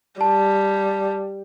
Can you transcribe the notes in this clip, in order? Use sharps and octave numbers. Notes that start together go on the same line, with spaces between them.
G3 A5